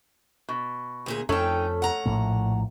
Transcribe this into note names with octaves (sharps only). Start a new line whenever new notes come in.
B2
D2 A#2 G#4
F2 A3 C#4 D#4 A4 G5
F#5 A#5
A#1 A2 A#3